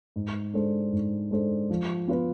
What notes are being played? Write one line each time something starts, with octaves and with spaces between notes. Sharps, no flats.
G#2
G#3 D4 A4 C5
G#2
G#3 D4 A4 C5
F3
B3 F4 B4